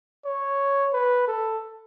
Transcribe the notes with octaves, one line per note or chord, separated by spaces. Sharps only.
C#5
B4
A4